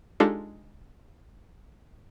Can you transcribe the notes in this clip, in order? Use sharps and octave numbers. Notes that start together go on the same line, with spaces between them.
G#3 D4 D#4 F4 G4 A4